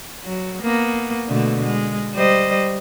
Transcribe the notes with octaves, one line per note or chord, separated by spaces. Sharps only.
F#3
A#3 B3
B2 D3 A3
G#3
G3 C5 D#5